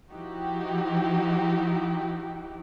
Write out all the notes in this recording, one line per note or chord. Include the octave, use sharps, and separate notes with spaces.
F3 D#4 E4 F#4 G4